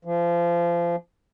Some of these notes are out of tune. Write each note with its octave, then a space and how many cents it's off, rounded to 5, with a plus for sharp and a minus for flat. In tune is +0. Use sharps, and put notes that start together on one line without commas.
F3 -30